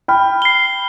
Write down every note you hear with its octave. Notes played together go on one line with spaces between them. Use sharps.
G5 B5 F6
C7 G7